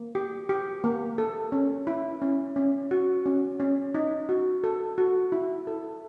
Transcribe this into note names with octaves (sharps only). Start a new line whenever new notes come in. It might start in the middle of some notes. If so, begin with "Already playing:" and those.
Already playing: A#3
G4
G4
A#3
A4
C#4
E4
C#4
C#4
F#4
C#4
C#4
D#4
F#4
A4
F#4
E4
A4